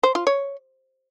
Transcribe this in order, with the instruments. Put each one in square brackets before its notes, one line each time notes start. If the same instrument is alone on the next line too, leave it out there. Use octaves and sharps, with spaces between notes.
[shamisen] C5
F4
C#5